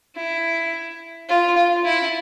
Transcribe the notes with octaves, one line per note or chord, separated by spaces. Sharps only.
E4
F4
F4
E4